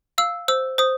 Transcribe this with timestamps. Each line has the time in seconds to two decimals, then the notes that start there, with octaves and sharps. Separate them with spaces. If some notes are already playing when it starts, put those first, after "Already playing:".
0.18 F5 E6
0.48 C5 E6
0.78 C5 D#6